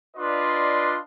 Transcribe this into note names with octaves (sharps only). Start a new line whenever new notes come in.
D4 F4 B4 D5 D#5 C6